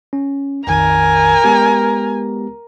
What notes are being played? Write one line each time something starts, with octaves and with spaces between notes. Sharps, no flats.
C#4
A#1 F2 D#3 A#4 G#5
G#3 B3 G4